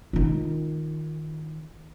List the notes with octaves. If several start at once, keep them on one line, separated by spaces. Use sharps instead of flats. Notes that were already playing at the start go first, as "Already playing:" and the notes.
D#3 F4